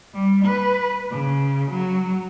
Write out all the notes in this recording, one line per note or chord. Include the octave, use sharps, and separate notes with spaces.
G3
B4
C#3
F#3